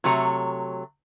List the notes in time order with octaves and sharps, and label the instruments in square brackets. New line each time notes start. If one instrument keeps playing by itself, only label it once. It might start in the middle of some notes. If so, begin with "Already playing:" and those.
[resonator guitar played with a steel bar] C3 F#3 A3 C#5 A#5